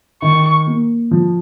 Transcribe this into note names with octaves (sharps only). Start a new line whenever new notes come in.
D#3 C#6
A#3
F3